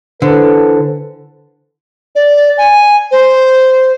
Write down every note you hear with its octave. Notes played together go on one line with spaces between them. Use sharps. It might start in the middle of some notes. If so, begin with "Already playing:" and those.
D3 E3 A4 B4 C5
D5
G#5
C5